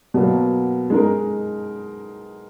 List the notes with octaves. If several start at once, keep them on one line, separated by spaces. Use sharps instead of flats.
B2 F#3 A#3
G#3 D#4 A#4